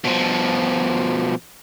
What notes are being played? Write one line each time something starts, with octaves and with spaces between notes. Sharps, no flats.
B2 F3